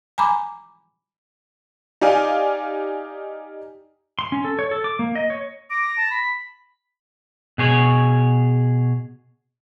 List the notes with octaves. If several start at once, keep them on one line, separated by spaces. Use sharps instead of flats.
G#5 A#5 B5 D6
D#4 G4 D5 F5 G#5
C6
C#4
A4
C#5
A4
D6
A#3
D#5
C#5
D6 A#6
A5
B5
B2 G#4 C#5